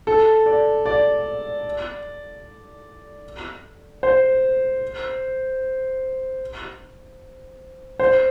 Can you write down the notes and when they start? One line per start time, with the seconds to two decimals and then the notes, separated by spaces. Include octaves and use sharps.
0.07 A4
0.46 D5
0.86 D5
4.03 C5
8.00 C5